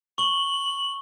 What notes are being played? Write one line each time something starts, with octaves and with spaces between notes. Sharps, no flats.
C#6 F#7 G7